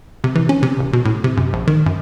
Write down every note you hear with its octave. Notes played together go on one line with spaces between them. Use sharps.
C3
E3
C#4
C3
D1
B2
A2
C3
F#2
A#1
D#3
F#2